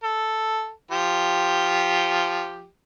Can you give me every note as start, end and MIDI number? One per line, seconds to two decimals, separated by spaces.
0.03 0.71 69
0.91 2.67 53
0.91 2.67 67